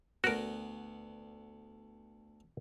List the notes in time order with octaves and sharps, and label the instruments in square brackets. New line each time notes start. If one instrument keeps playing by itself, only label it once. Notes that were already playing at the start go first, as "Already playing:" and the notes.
[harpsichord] D2 B3 [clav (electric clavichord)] F#4 A#4